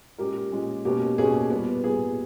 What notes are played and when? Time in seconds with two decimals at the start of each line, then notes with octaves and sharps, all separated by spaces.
0.18 A#2 G#3 C#4 G4 A#4
0.52 A#2 G#3 C#4
0.85 B2 A#3 C#4 G4
1.18 B2 A#3 C#4 G#4
1.50 A#2 G3 B3
1.83 A#2 G3 B3 G#4